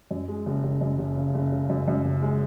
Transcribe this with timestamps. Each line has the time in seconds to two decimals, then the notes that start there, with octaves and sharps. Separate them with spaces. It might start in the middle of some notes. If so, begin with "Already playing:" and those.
0.11 F#2
0.28 G#3
0.46 F#1
0.64 F#1
0.81 F#2
0.99 F#1
1.17 C#3
1.35 F#1
1.52 C#3
1.69 F#2
1.88 F#2
2.05 F#1
2.23 G#3